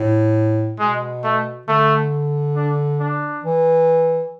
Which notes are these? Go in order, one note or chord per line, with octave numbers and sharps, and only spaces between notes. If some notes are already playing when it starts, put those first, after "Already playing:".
Already playing: A2
B2 G#3
A3
D3 A3
D4
D4
E3